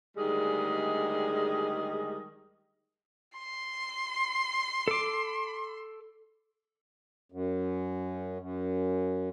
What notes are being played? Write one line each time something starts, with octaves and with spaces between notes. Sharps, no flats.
D2 D#3 G3 G#3 G#4 D#5
C6
A4 D6
F#2
F#2